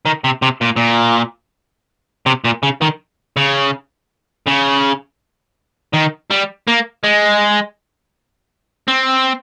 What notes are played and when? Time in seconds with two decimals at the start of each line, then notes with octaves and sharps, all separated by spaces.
0.06 D#3
0.24 C3
0.42 C3
0.61 A#2
0.76 A#2
2.26 C3
2.45 A#2
2.63 C#3
2.81 D#3
3.37 C#3
4.47 C#3
5.94 D#3
6.30 G3
6.68 A#3
7.04 G#3
8.88 C4